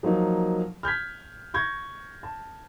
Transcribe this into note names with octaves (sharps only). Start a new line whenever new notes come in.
F3 F#3 A#3 D#4
F6 G6 G#6 B6
C#6 G6 G#6 A#6
A5